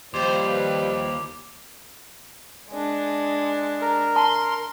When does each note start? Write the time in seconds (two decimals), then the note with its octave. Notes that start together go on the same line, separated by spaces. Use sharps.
0.14 D#2 F3 G3 C5 D6
0.49 B4
2.69 G#3 D4
3.81 A#4
4.16 A5 C6